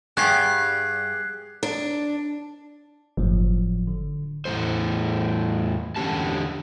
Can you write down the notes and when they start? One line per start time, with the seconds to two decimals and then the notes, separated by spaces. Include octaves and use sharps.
0.17 G2 G3 B3 G4 G#4 F#6 G#6 C7
1.63 D4
3.17 G1 A2 F3 F#3
3.87 D3
4.45 E2 A2 G#3 A3 C5
5.96 E2 D3 F3 C#4 G4 A5